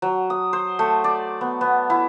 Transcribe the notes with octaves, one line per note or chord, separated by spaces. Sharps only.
F#3
D#6
C5
A3
D5
B3
B3
E4